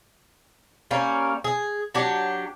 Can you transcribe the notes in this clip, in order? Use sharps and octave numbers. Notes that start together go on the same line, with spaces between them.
G3 A#3 C#4
G#4
F#3 D4 G4